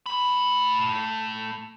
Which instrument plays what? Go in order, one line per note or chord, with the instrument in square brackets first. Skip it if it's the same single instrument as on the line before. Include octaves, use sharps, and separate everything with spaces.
[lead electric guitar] A3 B5